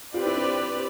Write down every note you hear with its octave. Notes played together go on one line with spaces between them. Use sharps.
C4 F4 G4 B4 D5
E4
D4